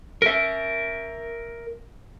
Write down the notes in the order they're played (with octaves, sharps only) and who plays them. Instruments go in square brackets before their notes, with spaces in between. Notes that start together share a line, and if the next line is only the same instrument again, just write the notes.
[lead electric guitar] A#4 E5